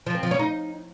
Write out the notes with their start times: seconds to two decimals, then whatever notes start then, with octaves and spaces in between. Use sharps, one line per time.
0.06 F3
0.15 C4
0.23 F3
0.31 C#4
0.39 D#4